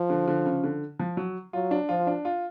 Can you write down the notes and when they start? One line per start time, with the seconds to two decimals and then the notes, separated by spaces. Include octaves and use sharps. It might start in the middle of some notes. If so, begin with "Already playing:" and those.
Already playing: F3
0.10 D3
0.28 D3
0.46 C#3
0.64 D3
1.00 F3
1.17 F#3
1.53 F#3 F4
1.71 D4
1.89 F3 F4
2.07 D4
2.25 F4